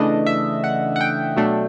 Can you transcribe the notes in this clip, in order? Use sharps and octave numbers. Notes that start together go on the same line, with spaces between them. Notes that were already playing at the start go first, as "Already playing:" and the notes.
Already playing: C#3 E3 A3 D4 D#5
E5
F#5
F#5
G5
B2 F#3 A3 D4